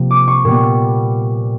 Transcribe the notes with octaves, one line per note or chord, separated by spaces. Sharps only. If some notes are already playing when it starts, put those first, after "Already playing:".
Already playing: C3 F3 A#3
D6
C#6
A#2 G3 B3